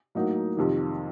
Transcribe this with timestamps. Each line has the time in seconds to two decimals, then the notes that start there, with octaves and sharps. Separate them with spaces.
0.15 A2 F#3 A#3 D#4 F#4
0.57 F2 C3 D#3